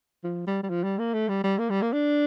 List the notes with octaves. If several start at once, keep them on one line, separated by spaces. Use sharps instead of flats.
F3
G3
G3
F3
G3
A#3
A3
G3
G3
A#3
G3
A#3
D4